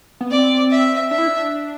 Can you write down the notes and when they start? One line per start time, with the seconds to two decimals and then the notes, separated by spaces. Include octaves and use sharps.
0.21 B3
0.31 C4 D5
0.71 E5
1.11 D4 E5
1.18 E4
1.27 D4